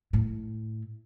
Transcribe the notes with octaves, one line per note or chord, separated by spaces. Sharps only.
A2